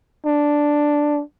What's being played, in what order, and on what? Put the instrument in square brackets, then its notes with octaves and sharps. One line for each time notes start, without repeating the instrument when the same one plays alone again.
[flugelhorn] D4